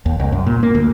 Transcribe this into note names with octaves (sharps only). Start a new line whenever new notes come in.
D#2
C2
F#2
A#2
A#3
D2